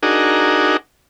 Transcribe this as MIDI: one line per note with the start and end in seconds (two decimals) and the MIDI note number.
0.03 0.77 62
0.03 0.77 63
0.03 0.77 66
0.03 0.77 68
0.03 0.77 70